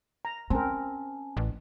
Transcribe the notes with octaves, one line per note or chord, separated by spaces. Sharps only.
A#5
C4 C#4 A#4 G#5 A5
A1